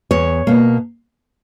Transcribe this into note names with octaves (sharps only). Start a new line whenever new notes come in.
E2 C#5
B2 A#3